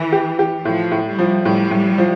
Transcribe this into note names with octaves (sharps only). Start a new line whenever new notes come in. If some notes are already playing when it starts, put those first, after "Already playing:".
Already playing: A2 E3
G4
G4
A2 F3
A2
G3
F3
A2 G3
A2
F3